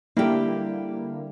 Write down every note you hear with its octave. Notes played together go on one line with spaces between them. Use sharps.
D3 G3 A#3 E4 G4